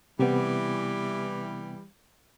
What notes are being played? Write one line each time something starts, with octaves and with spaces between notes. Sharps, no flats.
C3 E3 G3 B3